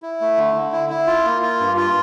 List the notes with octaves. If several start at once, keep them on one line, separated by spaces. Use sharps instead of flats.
E4
A3
D3
D3
E4
E4
F4
A#3
F4
G2
F4